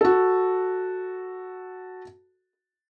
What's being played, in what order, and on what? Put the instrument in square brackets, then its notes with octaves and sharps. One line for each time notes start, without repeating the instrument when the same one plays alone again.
[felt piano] F#4 A4